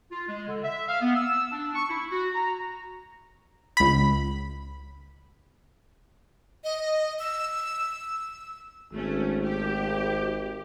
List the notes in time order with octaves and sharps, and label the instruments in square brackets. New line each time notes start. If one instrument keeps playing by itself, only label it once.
[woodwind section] F4
G#3
D3
E5
F5
B3
E6
D4
C#6
E4
F#4
A#5
[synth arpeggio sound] C#2 B5
[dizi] D#5
E6
[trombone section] G#1 [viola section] A3 C#4
[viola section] G4